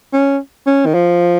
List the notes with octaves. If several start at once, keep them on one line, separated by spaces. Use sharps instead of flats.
C#4
C#4
D#3
F3